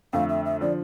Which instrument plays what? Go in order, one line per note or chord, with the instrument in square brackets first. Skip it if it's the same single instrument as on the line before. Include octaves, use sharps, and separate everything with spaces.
[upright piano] F2 D3 A3 [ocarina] F5
[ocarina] E5
E5
[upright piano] D3 F3 [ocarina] D5